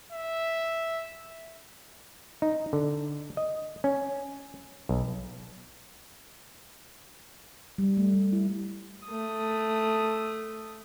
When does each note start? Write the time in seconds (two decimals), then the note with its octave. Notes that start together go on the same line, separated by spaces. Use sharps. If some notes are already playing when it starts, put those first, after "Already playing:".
0.12 E5
2.42 D#4
2.73 D3
3.37 D#5
3.84 C#4
4.89 B1
7.78 G3
7.97 A3
8.13 G3
8.33 E4
9.06 A3 D#6